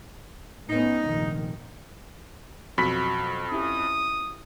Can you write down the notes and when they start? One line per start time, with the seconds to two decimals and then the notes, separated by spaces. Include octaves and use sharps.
0.69 A2 B3 C#4 D#4
1.07 F1 A#1 D#3
2.78 F2 B2 F#3 F#4 B5 B6
3.51 C#4 E4 G4 D#6